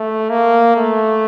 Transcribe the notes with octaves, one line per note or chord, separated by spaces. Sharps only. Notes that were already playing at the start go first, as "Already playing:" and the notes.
Already playing: A3
A#3
A3